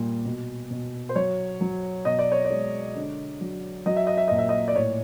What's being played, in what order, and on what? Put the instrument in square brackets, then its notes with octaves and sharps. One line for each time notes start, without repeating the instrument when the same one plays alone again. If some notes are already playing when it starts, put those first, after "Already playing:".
Already playing: [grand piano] A#2 G3
B2
B2
C5
F#3 C#5
F#3
B2 D#5
D5
C#5
D5
G#3
D3
F#3
F#3 D#5
E5
D#5
E5
A#2 D#5
E5
D#5
D5
A2 C#5